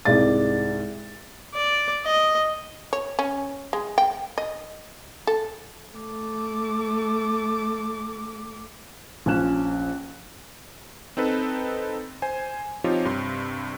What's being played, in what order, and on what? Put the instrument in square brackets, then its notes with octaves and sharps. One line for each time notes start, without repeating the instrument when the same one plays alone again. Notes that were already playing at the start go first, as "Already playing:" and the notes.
[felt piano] C2 G#2 D5 A6
[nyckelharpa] D5
D#5
[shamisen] C#5
C#4
G#3
G5
D#5
A4
[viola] A3 D6
[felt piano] A#1 F3 C#4 F#6 E7
[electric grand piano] C4 D#4 A4 B4
C5 G#5
F3 C4 D#4 F4 G4 C#5
G2 C3 C6